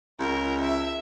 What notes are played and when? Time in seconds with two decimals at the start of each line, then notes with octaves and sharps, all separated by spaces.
0.20 C#2 A#4
0.61 E5